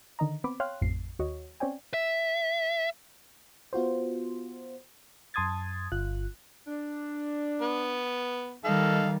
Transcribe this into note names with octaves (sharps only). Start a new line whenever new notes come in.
D3 D#3 D#5 A#5
B3 C4 B5 D6
C#5 F5 G5 C6 F6 F#6
A1 F2 C7
D#2 F#4 C#5 D#5
C4 C#4 C#5 D5 G5 G#5
E5
B3 F4 F#4 C5
F#2 A5 C6 D#6 G#6 A6
G1 F4 F#6
D4
B3
D#3 G3 A4 D#5 F5